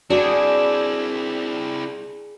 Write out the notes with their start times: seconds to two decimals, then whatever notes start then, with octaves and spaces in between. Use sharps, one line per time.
0.10 C4 D4 E4 F#4 G#4